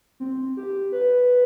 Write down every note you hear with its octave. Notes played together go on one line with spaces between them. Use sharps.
C4
G4
B4